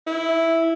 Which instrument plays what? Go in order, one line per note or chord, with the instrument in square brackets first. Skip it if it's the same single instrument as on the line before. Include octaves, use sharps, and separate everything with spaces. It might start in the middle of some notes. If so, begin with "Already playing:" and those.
[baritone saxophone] E4